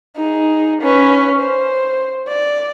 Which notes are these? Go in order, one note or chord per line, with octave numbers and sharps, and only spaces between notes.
D#4 G#4
C#4 B4
C5
D5